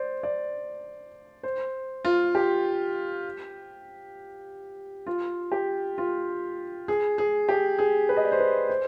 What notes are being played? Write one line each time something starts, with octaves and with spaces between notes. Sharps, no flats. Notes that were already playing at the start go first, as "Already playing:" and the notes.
Already playing: C5 D5
D5
C5
F4
G4
F4
G4
F4
G#4
G#4
G4
G#4
B4
D#5
D5
C5
B4
C5